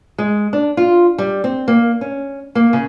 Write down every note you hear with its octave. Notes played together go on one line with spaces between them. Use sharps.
G#3
D4
F4
G3
C4
A#3
C#4
A#3
C#3